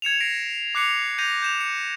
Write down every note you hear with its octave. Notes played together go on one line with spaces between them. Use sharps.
G#6 C#7 E7 F7
A#6 C7 D7
D6 F#6 C7 C#7 F7
G6 A#6 D#7 F7
G6 E7 F7
C#7